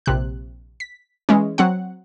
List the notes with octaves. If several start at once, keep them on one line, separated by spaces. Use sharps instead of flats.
A#1 C3 F#6
B6
E3 G#3 C#4
F#3 C4 F#5